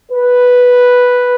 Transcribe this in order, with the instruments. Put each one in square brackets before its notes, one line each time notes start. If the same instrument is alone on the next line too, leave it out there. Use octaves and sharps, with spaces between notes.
[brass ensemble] B4